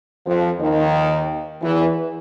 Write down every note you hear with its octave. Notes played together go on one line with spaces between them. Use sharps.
F2 F3
D#2 D#3
E2 E3